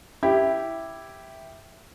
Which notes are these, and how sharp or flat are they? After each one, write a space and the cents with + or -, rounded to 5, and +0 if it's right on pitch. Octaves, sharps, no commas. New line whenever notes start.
E4 +0 G4 +0